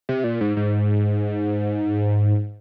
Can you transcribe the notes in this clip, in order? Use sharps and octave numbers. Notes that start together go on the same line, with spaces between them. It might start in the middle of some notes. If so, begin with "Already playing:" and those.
C3
A#2
G#2
G#2